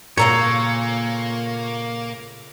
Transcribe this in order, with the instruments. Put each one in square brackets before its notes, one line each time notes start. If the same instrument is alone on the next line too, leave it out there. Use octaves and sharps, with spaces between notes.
[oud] A#2 [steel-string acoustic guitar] C#3 A4 A#5 [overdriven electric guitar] A#3 [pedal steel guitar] C#5